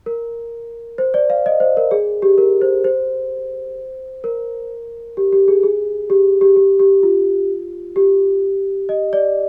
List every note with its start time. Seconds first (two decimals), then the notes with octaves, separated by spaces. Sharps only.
0.06 A#4
0.98 C5
1.14 D5
1.30 F5
1.46 D#5
1.60 C5
1.77 A#4
1.91 G#4
2.22 G4
2.38 A#4
2.62 C5
2.84 C5
4.24 A#4
5.17 G4
5.33 G4
5.48 G#4
5.63 G#4
6.10 G4
6.41 G4
6.56 G4
6.79 G4
7.03 F4
7.96 G4
8.89 D#5
9.13 D5